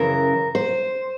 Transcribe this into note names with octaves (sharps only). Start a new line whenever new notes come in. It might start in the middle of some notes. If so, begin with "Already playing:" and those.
Already playing: F#2 C#3 E3 A#4
C5